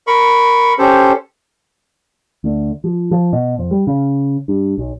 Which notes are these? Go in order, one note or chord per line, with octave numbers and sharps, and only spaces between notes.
A#4 B5 C#6
C#4 G4 A4 C5
D2
F3
F3
B2
F2
G3
C#3
G2
B1